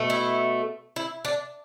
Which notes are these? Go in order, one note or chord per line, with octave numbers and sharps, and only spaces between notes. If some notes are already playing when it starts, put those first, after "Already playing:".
Already playing: B2 A3
E4
E4
D4